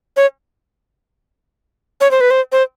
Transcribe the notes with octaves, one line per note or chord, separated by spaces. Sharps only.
C#5
C#5
C5
B4
C5
C5